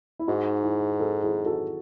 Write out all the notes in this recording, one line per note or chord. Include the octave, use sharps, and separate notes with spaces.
E4
G#2 D#4 F#4
E4 G#4
F#4 A4
E4 G#4
F#4 A4